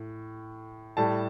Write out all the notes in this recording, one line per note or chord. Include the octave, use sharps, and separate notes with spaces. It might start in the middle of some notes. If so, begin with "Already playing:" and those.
Already playing: A2
A2 G3 A5